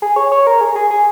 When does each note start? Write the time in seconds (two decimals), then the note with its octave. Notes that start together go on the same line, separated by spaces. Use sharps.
0.02 G#4
0.16 C#5
0.32 C#5
0.47 A#4
0.61 G#4
0.76 G#4
0.90 G#4